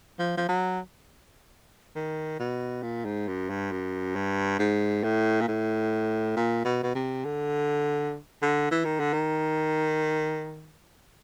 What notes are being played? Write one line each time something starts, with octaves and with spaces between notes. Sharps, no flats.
F3
F3
F#3
D#3
B2
A#2
G#2
F#2
G2
F#2
G2
G#2
A2
A#2
A2
A#2
B2
B2
C3
D3
D3
E3
D#3
D3
D#3